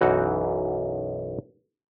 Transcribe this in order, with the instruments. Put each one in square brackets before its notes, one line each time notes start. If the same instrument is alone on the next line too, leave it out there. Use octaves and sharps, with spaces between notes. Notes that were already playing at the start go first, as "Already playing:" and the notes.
[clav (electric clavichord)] B1 F#2 E3 D#4 F#4